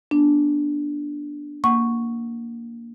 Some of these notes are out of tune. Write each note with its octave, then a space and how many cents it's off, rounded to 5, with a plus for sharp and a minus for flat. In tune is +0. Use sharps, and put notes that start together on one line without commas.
B3 -30 D4 +0
A#3 +0 F#5 +0 C#6 +0